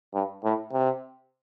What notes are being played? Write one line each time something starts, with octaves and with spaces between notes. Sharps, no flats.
G2
A2
C3